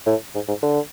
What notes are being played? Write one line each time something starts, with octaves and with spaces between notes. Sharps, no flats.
A2
G#2
G#2
D3